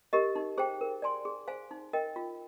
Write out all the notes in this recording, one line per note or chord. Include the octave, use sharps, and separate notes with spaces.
G4 A#4 D#5
D#4
G#4 C5 G5
A#4
D5 G#5 C6
G#4
C5 F5 G#5
D#4
A#4 D#5 G5
F4